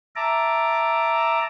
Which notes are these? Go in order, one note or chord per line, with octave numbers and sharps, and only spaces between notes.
E5 A5 A#5 D6